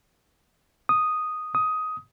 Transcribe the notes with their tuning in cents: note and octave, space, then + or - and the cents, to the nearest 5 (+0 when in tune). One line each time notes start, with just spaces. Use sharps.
D#6 -5
D#6 +10